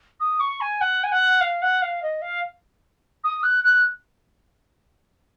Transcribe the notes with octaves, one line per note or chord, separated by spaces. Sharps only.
D#6
C#6
G#5
F#5
G#5
F#5
F5
F#5
F5
D#5
F5
D#6
F#6
F#6